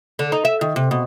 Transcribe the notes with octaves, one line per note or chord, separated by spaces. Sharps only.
D3
D#4
E5
D#3
C3
B2